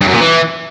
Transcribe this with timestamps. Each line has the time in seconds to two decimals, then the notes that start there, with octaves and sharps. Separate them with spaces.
0.01 G2
0.08 F#2
0.14 A#2
0.21 E3